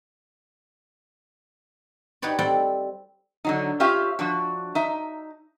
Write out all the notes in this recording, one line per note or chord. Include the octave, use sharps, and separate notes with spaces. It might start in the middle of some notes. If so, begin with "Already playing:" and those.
D#4 F#4 G4 B4 C#5 D5
G3 C4 A4 D5 F#5 G5
D3 F#3 D#4
C#4 F4 G4 E5 F5
F3 D4 F#4
D#4 E5